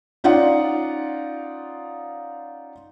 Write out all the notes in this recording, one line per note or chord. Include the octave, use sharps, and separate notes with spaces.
C#4 D#4 F4 D5 F#5